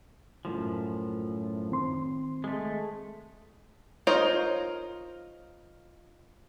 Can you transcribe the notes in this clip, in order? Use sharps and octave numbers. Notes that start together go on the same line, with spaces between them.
F#2 A2 F3
D#3 C4 C6
G#3 A3
D#4 F4 A#4 C5 C#5